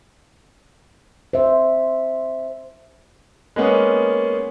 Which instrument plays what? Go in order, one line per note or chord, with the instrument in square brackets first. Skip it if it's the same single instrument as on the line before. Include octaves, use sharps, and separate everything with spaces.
[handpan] C5 E5
[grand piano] G#3 A#3 B3 C#4